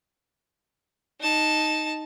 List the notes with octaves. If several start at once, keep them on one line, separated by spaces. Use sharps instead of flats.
D#4 A5